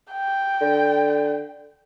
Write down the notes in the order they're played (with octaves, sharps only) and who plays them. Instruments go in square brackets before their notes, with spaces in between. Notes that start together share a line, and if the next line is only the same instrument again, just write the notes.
[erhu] G5
[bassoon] D3